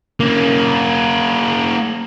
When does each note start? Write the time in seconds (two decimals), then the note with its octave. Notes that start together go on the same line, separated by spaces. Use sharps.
0.20 A#3 C#4